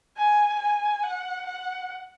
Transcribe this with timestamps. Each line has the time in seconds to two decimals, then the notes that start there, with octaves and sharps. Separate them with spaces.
0.17 G#5
0.59 G#5
1.03 F#5
1.46 F#5